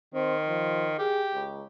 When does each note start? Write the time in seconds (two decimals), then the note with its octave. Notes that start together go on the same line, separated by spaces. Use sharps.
0.14 D#3 C4
0.49 F3
0.99 G4 G#4
1.34 C#2